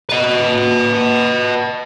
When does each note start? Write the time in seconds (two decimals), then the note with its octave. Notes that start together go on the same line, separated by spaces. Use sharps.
0.09 B4 D#5